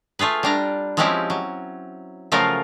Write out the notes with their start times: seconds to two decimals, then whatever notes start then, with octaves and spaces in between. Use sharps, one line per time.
0.19 A3 F4 G#4 B4
0.43 G3 D4 A#5
0.97 F3 G#3 C4 C#4 E4 G4
1.30 F#3
2.32 C#3 F3 F#3 A3 F4 A#4